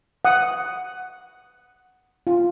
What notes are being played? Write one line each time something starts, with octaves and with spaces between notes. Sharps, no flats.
F#5 D#6
F4